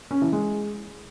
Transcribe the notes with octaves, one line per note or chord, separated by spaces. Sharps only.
C#4
E3
G#3